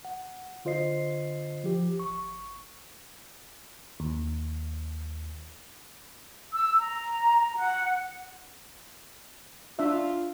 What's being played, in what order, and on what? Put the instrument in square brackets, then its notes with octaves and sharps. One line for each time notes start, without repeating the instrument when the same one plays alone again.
[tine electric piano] F#5
D3 F4 C5 D#5 C7
F3 G4
G#1 C#6
[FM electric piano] D#2
[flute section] E6
A#5
F#5
[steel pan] D4 E5 [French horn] F4